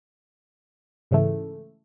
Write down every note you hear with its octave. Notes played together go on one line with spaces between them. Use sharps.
G#2 C#3 E3 A3